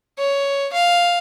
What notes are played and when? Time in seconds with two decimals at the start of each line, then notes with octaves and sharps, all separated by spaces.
0.18 C#5
0.73 F5